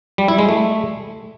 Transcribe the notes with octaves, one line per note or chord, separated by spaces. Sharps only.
G3
E4
G#3
A3